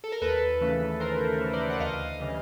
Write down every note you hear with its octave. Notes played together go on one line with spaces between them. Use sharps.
A4
A#4
D#2 A4 B4
C#3 E3 A3
D#2 A#4 C5
C#3 E3 A3
C5 D5
F#5
D2 D#5 F5
C#3 E3 G3